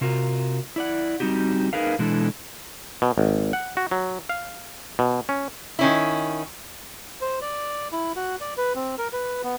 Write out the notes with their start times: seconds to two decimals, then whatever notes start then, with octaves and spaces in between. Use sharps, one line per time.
0.01 C3 F4 F#4 A#4
0.76 E4 D5 F#5
1.20 G3 C4 D#4 F#4 G4
1.73 D#4 G#4 A#4 B4 F5
1.99 B2 E3 G#3 D4 E4 A4
3.02 B2
3.18 G#1
3.53 F#5
3.77 F#4
3.91 F#3
4.29 F5
4.99 B2
5.29 C#4
5.79 D#3 C#4 E4
7.21 C5
7.42 D5
7.92 E4
8.16 F#4
8.41 D5
8.57 B4
8.75 C4
8.98 A#4
9.13 B4
9.44 B3